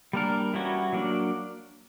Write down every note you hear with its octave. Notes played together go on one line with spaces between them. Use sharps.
G3 A#3 D4 A#4
E3 G3 C#4 F#4
F#3 A#3 D4